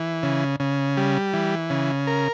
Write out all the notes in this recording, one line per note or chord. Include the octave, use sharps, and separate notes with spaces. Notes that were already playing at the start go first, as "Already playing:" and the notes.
Already playing: E3
C#3
C#3
G3
E3
C#3
A#4